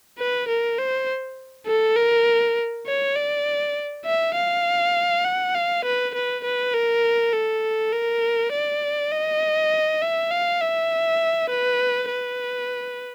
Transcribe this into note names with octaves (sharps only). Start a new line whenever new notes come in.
B4
A#4
C5
A4
A#4
C#5
D5
E5
F5
F#5
F5
B4
B4
B4
A#4
A4
A#4
D5
D#5
E5
F5
E5
B4
B4